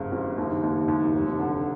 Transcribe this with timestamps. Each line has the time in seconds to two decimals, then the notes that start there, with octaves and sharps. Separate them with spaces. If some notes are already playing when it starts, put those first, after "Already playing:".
Already playing: F#1 G2 C#3
0.12 F#1
0.38 D#2
0.63 D#2
0.88 D#2
1.14 F1
1.39 D3